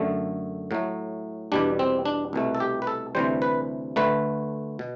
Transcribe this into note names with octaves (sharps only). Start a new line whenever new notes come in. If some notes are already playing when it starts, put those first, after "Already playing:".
Already playing: F#2 D3 A3
A2 F#3 A3
E2 B2 G3 D4
C4
D4
C2 B2 A3
A4
G4
B4
A4
D2 C3 E3 G3 C5
B4
D2 D3 A3 B4
B2